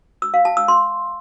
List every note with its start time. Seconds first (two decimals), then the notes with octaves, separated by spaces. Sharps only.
0.22 E6
0.34 F5
0.45 A5
0.57 E6
0.68 C6